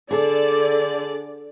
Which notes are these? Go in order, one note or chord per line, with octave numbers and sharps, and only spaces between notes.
D3 G#4 A4 D5